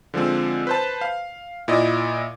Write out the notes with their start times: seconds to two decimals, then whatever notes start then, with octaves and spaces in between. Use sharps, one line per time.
0.14 D3 F3 G#3 C4
0.67 B4 C5 A5
1.01 F5
1.68 A#2 E4 D5 D#5